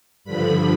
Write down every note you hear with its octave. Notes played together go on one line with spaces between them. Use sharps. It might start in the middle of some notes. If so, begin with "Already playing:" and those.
G2 D3 F3 B5